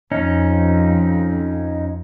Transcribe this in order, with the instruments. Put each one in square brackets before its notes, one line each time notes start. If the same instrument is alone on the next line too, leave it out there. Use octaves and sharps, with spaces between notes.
[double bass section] F2 [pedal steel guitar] C#4 D#4